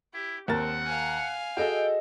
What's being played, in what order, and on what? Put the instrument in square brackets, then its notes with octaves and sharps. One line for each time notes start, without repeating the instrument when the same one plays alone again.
[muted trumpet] E4 [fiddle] G4
[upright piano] D#2 A#4 A6 [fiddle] C4 [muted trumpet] F#5
[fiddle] F5 G#5
[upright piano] F#4 A4 [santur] G#4 D#5 E5 [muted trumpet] G5